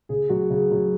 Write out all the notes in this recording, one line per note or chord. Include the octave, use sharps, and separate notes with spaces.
C#3 G#4
F#3 F#4
C#3
F#3